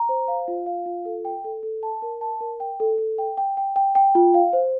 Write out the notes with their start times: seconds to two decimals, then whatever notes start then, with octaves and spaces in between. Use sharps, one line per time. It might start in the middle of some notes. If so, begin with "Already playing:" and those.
Already playing: A#5
0.09 C5
0.28 F5
0.48 F4
0.66 F5
0.86 F4
1.05 A4
1.25 G5
1.44 A4
1.63 A4
1.83 A5
2.02 A#4
2.21 A5
2.40 A#4
2.60 G5
2.80 A4
2.98 A4
3.18 G5
3.37 G5
3.57 G5
3.76 G5
3.95 G5
4.15 F4
4.34 F5
4.53 C5